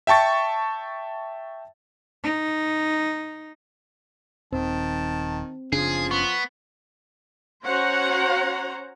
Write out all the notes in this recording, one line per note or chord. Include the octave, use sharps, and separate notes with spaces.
E5 G5 A5 C#6 A6
D#4
D#1 D#3 C4 A5
F#1 C#3 F3 D4 G#4
B3 C#6
C#4 F#4 C5 C#5 F#5 A#5